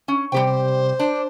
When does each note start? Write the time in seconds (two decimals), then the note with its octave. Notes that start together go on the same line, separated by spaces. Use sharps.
0.08 C#4
0.32 C3 G3 G4 C5 G5
0.99 D4